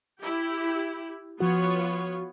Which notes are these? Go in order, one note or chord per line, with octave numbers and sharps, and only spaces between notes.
E4 G4
F3 B3 F4 F#4 C#5